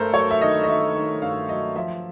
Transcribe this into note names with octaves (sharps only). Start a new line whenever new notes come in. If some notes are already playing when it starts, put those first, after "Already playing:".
Already playing: G2 A3 A4 A#4 C5
F#3 C#5
E5
D#3 D#5
D#5
D#3 E5
D#3
G2 F5
F#3 D#5
F3 E5